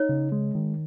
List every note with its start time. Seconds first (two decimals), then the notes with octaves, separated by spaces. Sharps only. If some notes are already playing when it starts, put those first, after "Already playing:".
Already playing: D#4 C#5
0.09 C#3
0.32 G#3
0.55 D#3